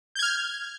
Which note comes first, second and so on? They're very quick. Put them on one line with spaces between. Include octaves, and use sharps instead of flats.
G6 G#6 F6